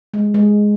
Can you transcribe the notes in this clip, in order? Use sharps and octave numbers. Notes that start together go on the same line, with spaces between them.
G#3
G#3